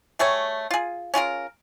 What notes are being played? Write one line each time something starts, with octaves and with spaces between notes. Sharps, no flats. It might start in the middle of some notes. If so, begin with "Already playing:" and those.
G3 A3 G#4 C#5
F4 G#4
C#4 F4 G#4 A#4